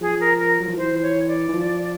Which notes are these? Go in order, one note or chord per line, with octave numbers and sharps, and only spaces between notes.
F3 G#4
A#4
A#4
F#3
F3
E3 C5
C#5
D5
E3
F3